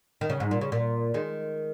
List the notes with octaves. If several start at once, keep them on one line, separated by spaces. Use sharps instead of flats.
D#3
C#3
G#2
A#2
C#3
A#2
D#3 G#3